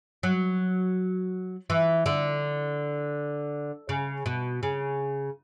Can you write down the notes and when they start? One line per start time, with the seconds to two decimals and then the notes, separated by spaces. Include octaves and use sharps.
0.23 F#3
1.70 E3
2.06 D3
3.89 C#3
4.26 B2
4.63 C#3